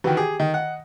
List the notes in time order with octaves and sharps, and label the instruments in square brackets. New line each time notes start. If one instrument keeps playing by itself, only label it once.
[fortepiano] D#3 E3 [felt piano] F#4 G5
[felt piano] G4 [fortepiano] G#4
[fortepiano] D#3 [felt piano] D#5
[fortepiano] F#5